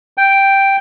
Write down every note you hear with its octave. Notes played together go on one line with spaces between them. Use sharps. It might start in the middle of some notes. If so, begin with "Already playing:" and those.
G5